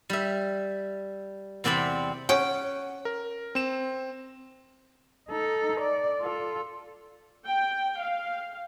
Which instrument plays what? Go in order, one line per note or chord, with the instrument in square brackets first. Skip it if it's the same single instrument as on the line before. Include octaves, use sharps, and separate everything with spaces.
[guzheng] G3 E5
E2 C3 C4 D5 B5
[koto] C#4 G5 [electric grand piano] F#5
[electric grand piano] A#4
C4 E7
[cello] D#4 A4
D5
F4 A4
[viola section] G5
F5